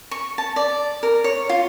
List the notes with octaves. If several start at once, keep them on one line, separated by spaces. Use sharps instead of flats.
C#6
A5
D5
A#4
C#5
F4